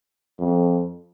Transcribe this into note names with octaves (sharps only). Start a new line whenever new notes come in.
F2